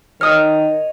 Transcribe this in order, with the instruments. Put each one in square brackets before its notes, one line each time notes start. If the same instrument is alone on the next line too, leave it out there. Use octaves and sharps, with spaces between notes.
[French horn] D#3 [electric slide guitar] C#5 D#5 [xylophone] D#6 F6